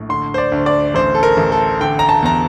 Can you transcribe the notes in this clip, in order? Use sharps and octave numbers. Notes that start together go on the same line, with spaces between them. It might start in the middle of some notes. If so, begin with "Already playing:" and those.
Already playing: A#1 A2
D3 C6
C5
D5
D2
D5
A1 C5
A4
A#4
A1
A4
D3 G5
A#5
A5
E2 A#5